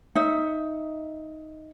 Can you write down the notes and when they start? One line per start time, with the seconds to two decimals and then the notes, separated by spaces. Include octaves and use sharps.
0.15 D#4 E5